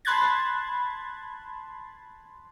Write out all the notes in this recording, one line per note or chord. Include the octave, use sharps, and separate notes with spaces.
A5 B5 C6 F#6 G#6 A6